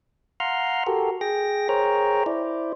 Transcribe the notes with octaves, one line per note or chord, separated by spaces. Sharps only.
F5 F#5 A#5 C6 F6
F#4 G4 A4 A#4
G#4 G5 A#6
G#4 A#4 C5 C#5 G5 A#5
E4 C5 D5